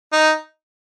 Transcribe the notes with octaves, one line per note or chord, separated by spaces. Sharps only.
D#4